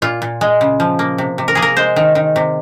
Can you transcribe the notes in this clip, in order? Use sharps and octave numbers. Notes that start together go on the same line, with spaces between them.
A#2 F4
A#2
G#3
C#3
F3
A#3
C3
C3
A#4
A#3 G#4
A#4
G#3 C5
D#3
D#3
C3